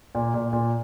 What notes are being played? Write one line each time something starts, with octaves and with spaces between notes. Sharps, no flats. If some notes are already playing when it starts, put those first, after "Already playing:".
A#2
A#2
A#2